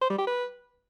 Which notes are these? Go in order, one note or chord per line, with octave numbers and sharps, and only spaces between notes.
C5
G3
G4
B4